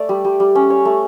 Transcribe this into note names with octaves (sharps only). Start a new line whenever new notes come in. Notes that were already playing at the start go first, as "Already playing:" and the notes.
Already playing: A3 D5
G3
G3
G3
C#4
C#5
A3